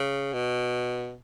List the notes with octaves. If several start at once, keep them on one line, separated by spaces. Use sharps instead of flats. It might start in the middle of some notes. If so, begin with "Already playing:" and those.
Already playing: C#3
B2